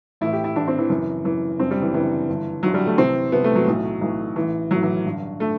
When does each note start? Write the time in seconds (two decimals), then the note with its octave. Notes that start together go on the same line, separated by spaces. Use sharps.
0.21 A1 A2 E3 E4
0.33 G4
0.44 E4
0.55 A1 A2 E3 D4
0.68 C4
0.78 E3
0.89 F#1 F#2 E3
1.24 F#1 F#2 E3
1.59 F#1 F#2 D3 C4
1.71 G3
1.82 E3
1.93 F#1 F#2 D3 E3
2.28 G1 G2 D3
2.63 G1 G2 D3 F#3
2.74 G3
2.86 A3
2.98 C2 C3 E3 C4
3.32 C2 C3 E3 B3
3.44 A3
3.55 F#3
3.67 B1 A2 E3
4.01 B1 A2 E3
4.36 A1 A2 E3
4.71 A1 A2 E3 F#3
4.83 E3
5.05 A1 G2 D3
5.40 D3 A3